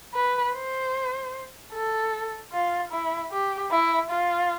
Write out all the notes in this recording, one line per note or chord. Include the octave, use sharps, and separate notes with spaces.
B4
C5
A4
F4
E4
G4
E4
F4